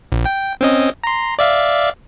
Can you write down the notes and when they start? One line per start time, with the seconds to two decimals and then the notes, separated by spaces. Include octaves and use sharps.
0.12 A#1
0.25 G5
0.61 C4 C#4 D#5
1.04 A#5 C6
1.39 D5 E5 F5